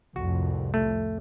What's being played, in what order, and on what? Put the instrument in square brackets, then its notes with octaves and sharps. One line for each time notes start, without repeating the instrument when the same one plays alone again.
[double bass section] C2 F2 A2 [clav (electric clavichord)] F#4
[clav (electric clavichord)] A3